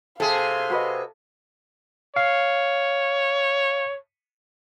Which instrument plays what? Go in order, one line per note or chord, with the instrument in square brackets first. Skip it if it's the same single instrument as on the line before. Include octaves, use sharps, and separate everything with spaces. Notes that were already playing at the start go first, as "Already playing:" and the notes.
[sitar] C3 G#4 [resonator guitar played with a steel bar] A4 [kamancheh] F5 C6
[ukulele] F#4 B4 D#5
[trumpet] C#5 [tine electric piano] F5